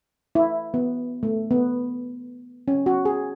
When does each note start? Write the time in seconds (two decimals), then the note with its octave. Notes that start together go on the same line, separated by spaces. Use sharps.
0.35 E4
0.74 B3
1.23 A3
1.51 B3
2.68 C#4
2.86 F#4
3.05 G#4